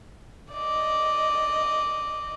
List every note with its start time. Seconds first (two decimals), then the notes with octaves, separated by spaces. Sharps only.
0.53 D5 D#5